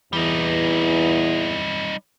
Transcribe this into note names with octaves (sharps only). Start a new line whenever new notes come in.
E2 E3 G3 D#4